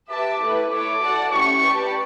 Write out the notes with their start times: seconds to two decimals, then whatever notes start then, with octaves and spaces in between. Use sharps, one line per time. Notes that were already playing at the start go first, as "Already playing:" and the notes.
0.09 G4 B4 E5 A5 D6
0.41 A3 E4 B4
0.71 E4 A4 C#5 E5 D6
1.01 F#4 A4 D5 F#5 A5
1.32 A3 C#4 E4 G4 C#6
1.62 G4 B4 D5 A5